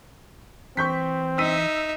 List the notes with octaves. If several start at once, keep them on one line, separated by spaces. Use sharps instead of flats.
E3 C4 C#6 G6 B6
D#4 E5 E6 B6 D#7